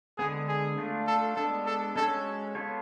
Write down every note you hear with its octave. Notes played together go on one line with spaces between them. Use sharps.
D3 G#3 B3 G#4
G#4
A3 D4 F4
A4
G#3 B3 D4 A4
A4
G#3 C#4 F#4 A4 C#5
B3 F4 A4 C#5